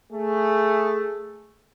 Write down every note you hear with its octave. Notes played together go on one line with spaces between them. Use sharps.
A3 G#4